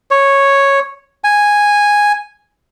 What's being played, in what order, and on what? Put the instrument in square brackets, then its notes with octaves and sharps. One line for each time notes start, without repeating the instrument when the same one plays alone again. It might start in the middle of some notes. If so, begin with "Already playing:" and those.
[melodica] C#5
G#5